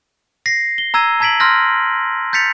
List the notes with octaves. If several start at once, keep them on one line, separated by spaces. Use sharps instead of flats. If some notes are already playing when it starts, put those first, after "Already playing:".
A#6 C7
G7
A#5 E6 G#6 D#7
A5 A#5 G#6 B6 D7 F#7
C6 E6 F6 G6 A#6
G6 A6 B6 C#7 F7